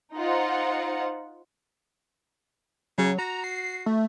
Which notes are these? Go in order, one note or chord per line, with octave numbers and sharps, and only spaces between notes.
D#4 F4 C5 F#5
C#3 F#3
F#4 A#5
C7
A3